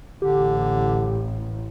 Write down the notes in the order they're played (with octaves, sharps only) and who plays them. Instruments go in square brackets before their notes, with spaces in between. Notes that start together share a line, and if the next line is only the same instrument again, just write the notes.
[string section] A1 [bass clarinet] D3 [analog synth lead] G4